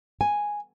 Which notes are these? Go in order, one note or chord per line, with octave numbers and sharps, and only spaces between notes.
G#5